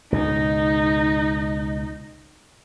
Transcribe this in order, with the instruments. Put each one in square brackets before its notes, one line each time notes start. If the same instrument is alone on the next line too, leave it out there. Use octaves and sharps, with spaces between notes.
[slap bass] C#2 G#2 B2 [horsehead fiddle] D#4